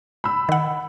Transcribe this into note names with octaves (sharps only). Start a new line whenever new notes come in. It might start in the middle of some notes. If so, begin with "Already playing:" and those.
B5 E6
D#3 F#5